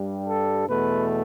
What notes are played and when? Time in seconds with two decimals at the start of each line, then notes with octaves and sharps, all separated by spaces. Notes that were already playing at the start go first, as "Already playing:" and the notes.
Already playing: G2 G3
0.26 A4
0.67 E2 B2 A3 B4